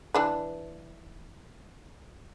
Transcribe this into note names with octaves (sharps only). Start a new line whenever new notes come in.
E3 D4 B4